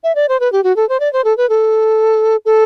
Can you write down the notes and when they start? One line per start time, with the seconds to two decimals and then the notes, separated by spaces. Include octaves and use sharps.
0.04 E5
0.15 D5
0.29 C5
0.40 B4
0.52 G4
0.64 F#4
0.76 A4
0.89 C5
1.00 D5
1.13 C5
1.24 A4
1.37 B4
1.49 A4
2.45 A4